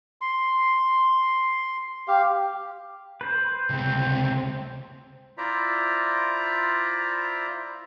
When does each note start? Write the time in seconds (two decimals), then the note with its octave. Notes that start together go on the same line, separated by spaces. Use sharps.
0.21 C6
2.08 G4 F5
3.21 B4 C5
3.70 C#2 C3 C4
5.38 E4 F4 C5 D5 E5 A#5